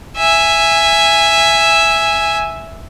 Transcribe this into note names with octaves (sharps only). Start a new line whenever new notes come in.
E5 G#5